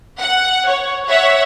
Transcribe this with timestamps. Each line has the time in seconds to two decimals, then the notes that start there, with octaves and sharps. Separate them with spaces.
0.21 F#5
0.68 C#5
1.07 C#5 E5 F#5